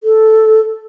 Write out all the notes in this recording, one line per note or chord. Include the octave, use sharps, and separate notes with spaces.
A4